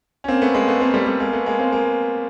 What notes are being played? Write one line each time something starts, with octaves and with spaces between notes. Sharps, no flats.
C#4
A#3 C4
A3 B3
G#3 A#3
A3 B3
A#3 C4
G3 A3
G3 A3
G#3 A#3
A3 B3
G#3 A#3
A#3 C4
G#3 A#3